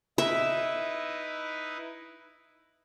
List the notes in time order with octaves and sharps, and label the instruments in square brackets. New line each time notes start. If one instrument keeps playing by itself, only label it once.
[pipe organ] D#4 E4 B4 [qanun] E5